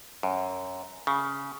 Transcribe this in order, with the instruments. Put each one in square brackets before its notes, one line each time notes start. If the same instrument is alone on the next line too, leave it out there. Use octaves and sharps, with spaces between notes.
[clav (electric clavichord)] F#2
C#3